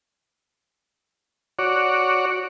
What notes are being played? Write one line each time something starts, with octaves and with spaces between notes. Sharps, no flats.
F#4 C#5 D5